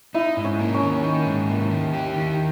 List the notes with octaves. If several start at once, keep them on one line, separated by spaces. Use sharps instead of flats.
D#4 E4
G#2
C#4
A#3
C#4
D#3
D#4
G#2
A#3
D#3
G4
D#3